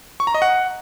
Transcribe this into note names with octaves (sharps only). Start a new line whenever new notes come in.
C#6
A#5
D#5
F#5